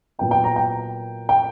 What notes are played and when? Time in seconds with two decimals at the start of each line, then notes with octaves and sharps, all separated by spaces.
0.19 A#2 F#3 B3 E4 G5
0.31 G5
0.44 A#5
0.56 G5
1.29 G5